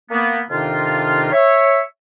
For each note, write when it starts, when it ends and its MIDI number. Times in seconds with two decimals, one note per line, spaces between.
0.11 0.40 58
0.11 0.40 59
0.50 1.31 41
0.50 1.31 48
0.50 1.31 51
0.50 1.31 62
0.50 1.31 63
0.50 1.31 65
1.32 1.81 73
1.32 1.81 76